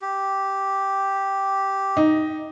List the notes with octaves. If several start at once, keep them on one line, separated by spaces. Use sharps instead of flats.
G4
D#4